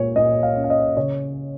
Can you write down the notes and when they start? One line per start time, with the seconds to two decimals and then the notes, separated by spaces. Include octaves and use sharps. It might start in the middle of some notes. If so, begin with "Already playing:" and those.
Already playing: A#2 G#3 C#5
0.16 A#2 D#5
0.43 F5
0.57 C#4
0.64 F5
0.70 D#5
0.97 C#3 C#5